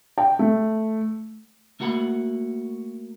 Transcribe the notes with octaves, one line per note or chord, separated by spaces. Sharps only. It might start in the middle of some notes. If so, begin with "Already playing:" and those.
G5
A3
A3 A#3 F#4 F#5 G5 B5